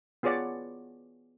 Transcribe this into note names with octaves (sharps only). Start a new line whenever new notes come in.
B3 F4 G#4 C#5 D5 F#5